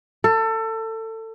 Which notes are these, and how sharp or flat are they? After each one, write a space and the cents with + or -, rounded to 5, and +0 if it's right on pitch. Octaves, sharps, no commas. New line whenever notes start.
A4 +25